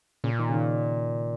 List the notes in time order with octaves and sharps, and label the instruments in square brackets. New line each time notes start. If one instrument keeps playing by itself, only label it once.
[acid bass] A#2 [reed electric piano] C#3
[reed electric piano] D#3
C#3
D#3